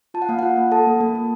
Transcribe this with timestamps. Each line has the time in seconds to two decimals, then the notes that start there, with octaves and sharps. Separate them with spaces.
0.14 F4 A5
0.22 F#5
0.29 A#3 F5
0.39 F4 F#5
0.57 A#3
0.71 A4 A5
0.87 A#3
1.01 A#3
1.15 A#3